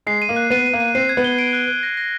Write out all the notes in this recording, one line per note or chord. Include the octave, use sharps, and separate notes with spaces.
G#3 C7
D#7
A#3
F#6
B3 D#7
D#7
A#3
D#7
C4 C7
G#6
B3
G7
D7
F#6
F#6
A#6
A#6